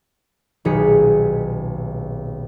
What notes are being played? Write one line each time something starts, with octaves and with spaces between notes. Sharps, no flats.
D#1 B1 D#4 G#4 B6 C#7